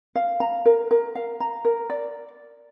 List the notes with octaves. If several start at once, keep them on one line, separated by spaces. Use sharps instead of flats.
F5
A#5
A#4
A#4
F5
A#5
A#4
D5